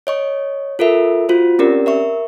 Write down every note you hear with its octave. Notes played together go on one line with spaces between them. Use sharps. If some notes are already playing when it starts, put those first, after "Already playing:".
C#5 D#5 C#6
F4 A4 A#4 E5
F4 F#4 C5
C4 C#4 G4 A#4 D5
A#4 E5 C#6